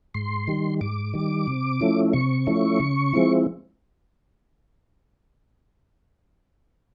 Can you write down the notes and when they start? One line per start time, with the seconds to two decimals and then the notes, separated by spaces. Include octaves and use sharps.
0.14 G#2 C6
0.47 D#3 G3
0.81 G#2 D6
1.14 D#3 G3
1.47 C3
1.81 F3 A3 C#4 E4
2.13 C3 C#6
2.47 F3 A3 C#4 E4
2.80 C#3
3.13 F3 G#3 C4 E4